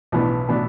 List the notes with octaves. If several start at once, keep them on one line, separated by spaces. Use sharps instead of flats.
B1 A2 E3 B3 D4
A2 E3 B3 D4